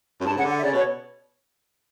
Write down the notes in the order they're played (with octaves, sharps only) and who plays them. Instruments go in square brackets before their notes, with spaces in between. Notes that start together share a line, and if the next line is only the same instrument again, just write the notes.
[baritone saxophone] F#2
[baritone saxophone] G2 [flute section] A5
[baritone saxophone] C#3 [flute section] F#5
[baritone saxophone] D3
[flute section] F#5
E5
[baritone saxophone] C#3 [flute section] D5
[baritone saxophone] B2 [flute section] C#5